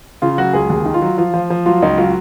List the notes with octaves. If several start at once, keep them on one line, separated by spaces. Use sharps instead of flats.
C#3 F4
F#3 F#4
C#2 G#4
D#2 G#4
D#3
F4
F#3
F3 F4
F3
F3
F#3 F4
C#2 D#4
F#3 F4